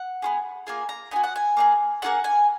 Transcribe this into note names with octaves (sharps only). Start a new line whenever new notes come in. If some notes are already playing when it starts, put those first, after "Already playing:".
Already playing: F#5
B3 F4 G#4
A#3 F4 G#4 G#5
A#5
B3 D#4 F#4 G#5
F#5
G#5
A#3 D#4 G#4
A#3 F4 G#4 F#5
G#5